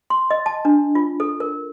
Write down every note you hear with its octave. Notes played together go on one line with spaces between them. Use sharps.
C6
D#5
A5
D4
F4
A4
A#4